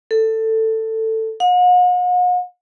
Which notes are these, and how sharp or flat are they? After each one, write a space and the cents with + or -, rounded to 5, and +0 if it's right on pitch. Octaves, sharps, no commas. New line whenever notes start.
A4 +15
F#5 -45